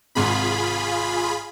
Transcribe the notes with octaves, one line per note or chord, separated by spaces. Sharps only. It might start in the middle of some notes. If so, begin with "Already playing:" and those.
G#1 G#2 C3 F4 G#4 B5